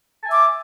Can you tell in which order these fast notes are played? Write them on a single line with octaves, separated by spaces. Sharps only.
A5 G#5 E5 D6